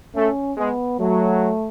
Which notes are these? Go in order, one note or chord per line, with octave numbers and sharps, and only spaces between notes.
A3 C#4
G#3 B3
F#3 A3